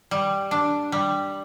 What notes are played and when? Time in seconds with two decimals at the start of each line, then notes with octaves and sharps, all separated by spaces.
0.11 G3
0.51 D4
0.92 G3